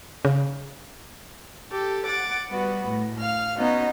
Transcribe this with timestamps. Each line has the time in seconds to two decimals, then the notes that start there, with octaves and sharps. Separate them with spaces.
0.25 C#3
1.71 G4 A4
2.04 F#5 D6 A6
2.50 G3 B3 F#4
2.85 A2
3.17 F5 F6
3.58 B3 C#4 D#4 F#4